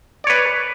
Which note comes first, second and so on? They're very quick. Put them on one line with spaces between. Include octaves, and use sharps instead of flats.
D5 C#5 B4